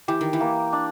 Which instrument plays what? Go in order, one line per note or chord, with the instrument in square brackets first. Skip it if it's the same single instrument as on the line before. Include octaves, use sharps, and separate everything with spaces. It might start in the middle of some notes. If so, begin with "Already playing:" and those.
[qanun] E3 [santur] G4
[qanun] D#3
E3
[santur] A#3
D4